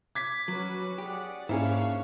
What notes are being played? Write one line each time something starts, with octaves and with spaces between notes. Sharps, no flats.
D6 G#6 B6
F#3 C#4 F#4 B4
G4 G#4 D5 F#5
G#2 A#3 C#4 D4 E4 G#4 C#5 F5